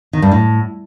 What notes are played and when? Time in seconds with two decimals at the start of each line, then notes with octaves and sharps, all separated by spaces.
0.13 D#3
0.22 G2
0.31 A2